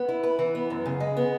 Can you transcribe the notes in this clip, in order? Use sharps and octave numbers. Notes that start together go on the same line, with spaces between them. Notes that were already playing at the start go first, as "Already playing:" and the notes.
Already playing: B3
E4
B4
E3
B3
F#2
C#3
G#3
B3